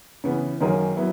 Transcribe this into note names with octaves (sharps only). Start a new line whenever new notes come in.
C#3 E3 B3
F#2 D#3 A#3 C#4 G#4
F#3 B3 E4